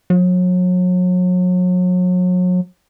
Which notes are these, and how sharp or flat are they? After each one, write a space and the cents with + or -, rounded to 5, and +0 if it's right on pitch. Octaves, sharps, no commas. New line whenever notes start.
F#3 -35